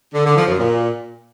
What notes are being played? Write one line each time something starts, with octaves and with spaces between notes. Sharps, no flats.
D3
D3
F3
F#2
A#2